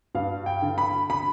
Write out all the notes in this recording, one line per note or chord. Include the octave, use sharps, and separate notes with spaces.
G2 F5
G5
D3
B5
B5